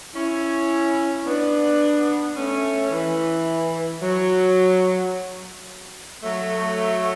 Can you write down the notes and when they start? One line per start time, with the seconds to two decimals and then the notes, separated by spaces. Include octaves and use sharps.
0.15 C#4 E4
1.26 B3 D4
2.36 A3 C#4
2.92 E3
4.02 F#3
6.23 F#3 A3